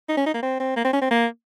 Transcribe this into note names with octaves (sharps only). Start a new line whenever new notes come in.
D#4
C#4
D#4
A#3
C4
C4
A#3
C4
C#4
C4
A#3